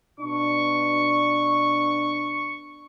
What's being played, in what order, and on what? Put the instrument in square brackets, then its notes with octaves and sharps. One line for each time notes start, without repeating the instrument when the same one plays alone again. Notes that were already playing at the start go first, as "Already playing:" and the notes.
[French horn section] B2 D4 [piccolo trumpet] C#6